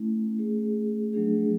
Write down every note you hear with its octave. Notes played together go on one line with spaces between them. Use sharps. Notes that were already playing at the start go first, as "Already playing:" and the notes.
Already playing: A3 C#4 E4
A3 C#4 G#4
F#3 A3 D4 G#4